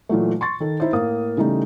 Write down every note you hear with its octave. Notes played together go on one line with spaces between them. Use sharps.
A#2 E3 F#3 A3
C6 C#6 A6
D#3 A4
D#4 E4 C5
A2 A#3 F5 D#6
C#3 E3 G3 A3 D#4